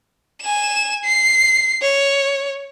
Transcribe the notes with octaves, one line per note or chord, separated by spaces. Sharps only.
G#5 E7
C7
C#5